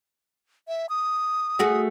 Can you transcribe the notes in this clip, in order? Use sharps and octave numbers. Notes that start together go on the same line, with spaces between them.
E5
D#6
A3 F#4 G#4